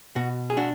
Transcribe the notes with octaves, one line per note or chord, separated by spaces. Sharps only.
B2 F#4
G#4
D4 F#4